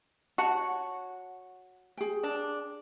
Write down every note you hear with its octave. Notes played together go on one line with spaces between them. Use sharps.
F#4 C#5 F#5 A5
G#4 G5
D4